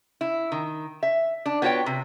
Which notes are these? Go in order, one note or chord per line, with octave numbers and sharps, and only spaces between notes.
E4
D#3
E5
D4
B3 F4 F#4 C#5 G5
C3